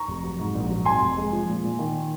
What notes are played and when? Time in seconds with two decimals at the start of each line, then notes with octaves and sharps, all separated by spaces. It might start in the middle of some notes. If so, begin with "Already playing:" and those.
Already playing: A#5 C#6
0.08 F1
0.24 F#3
0.39 G#2
0.55 A#1
0.70 F#3
0.85 F2 G#5 C6
1.01 F1
1.17 G#3
1.33 F3
1.48 A#2
1.64 A#2
1.79 D#3